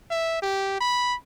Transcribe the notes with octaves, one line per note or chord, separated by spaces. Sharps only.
E5
G4
B5